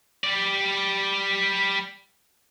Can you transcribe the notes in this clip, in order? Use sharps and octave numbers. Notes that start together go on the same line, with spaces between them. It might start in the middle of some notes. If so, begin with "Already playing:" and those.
G3 D5